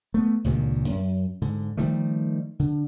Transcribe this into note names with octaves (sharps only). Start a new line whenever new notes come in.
A3 B3
C#2 G2 A#2 D#3
F#2
G#2 D3
D#3 F3 G3 A3
D3